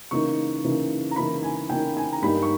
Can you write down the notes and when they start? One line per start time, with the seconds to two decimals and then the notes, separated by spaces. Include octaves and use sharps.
0.11 C#3 E3 A#3 D#4 C#6
0.64 C#3 E3 A#3 D#4
1.11 A#5
1.16 C#3 E3 A#3 D#4 B5
1.43 G#5
1.70 C#3 E3 A#3 D#4 G5
1.97 G#5
2.12 A#5
2.22 G2 G3 A#3 D#4 B5
2.43 C#6